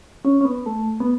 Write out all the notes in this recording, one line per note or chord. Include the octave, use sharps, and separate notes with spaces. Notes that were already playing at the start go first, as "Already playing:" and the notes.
C#4
C#4
B3
A3
B3